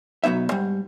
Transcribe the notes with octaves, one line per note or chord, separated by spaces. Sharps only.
B1 F#3 B3 D#4 E5
G#2 G3